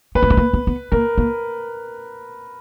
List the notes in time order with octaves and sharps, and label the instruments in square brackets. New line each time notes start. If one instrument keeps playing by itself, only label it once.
[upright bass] B3 [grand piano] B4
[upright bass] A#3
G#3
A#3
B3
B3
[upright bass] A#3 [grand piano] A#4
[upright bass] A#3